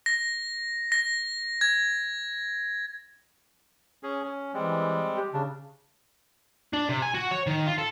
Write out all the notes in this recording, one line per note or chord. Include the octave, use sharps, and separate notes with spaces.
A#6
A#6
G#6
C#4 G#4
C#4
E3 G3 G#3 C4
G4
C#3 D4
D4
C3
G#5
F#4
C#5
D#3
F4
A4